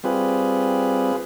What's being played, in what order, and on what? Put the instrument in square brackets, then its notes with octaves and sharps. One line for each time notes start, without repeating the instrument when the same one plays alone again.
[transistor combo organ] G3 C4 F4 G#4 B4